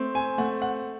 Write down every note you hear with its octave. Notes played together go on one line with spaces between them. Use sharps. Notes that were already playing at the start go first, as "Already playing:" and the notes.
Already playing: A3 C4
G#5
A3 F#5
F#5